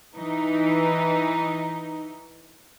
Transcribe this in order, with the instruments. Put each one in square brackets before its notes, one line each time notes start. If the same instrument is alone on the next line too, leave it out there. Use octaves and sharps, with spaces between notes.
[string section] E3 D#4